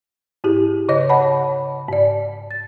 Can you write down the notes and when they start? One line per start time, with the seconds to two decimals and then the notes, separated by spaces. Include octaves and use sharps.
0.44 G#2 E4 G4 G#4
0.89 C#3 C#5 D#5 A#6
1.09 C#5 F#5 A5 B5
1.88 G#2 D5
2.51 A6